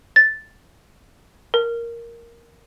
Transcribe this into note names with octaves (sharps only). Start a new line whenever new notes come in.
A6
A#4